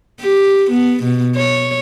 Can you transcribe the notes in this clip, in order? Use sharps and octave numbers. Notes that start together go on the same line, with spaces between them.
G4
B3
B2
C#5